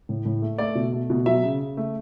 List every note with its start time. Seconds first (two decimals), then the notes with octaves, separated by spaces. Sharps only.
0.09 A2
0.25 A2
0.42 A3
0.58 A3 D5
0.75 B2
0.93 A3
1.10 B2
1.26 F#3 E5
1.43 C#3
1.61 C#3
1.77 A3